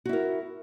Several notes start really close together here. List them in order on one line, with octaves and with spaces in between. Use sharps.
F#4 E4 A#4